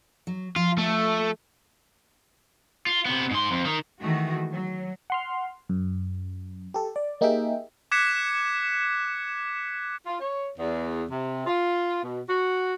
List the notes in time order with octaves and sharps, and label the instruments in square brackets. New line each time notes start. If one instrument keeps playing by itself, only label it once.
[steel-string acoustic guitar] F#3
[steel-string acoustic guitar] F3 [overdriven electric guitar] F4
[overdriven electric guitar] A3
F4
C3 B3
G#2 C6
F2
D#3
[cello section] D#3 E3 G#3 A3 F#4
F#3
[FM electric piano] F#5 C6 F6
F#2
G4 A4
D5
A#3 D#4 G4 G#4 E5 G5
[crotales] D6 F#6 G#6 B6 C#7 E7
[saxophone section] F4
C#5
E2
C3
F4
B2
F#4